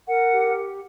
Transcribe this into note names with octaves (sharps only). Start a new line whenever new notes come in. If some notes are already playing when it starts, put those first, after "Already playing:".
A#4 F#5
G4